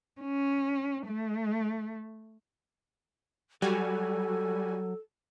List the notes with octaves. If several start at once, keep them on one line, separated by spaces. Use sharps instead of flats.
C#4
A3
F#3 G3 F#4 A4 G#5